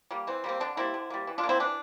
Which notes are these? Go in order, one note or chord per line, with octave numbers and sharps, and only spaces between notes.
G3 A#3
E3 C4
G3 A#3 C4
D3 D4
G3 A#3 C4 E4
D3
G3 A#3
E3
D4 F4
A#3
C4 E4
E3 D4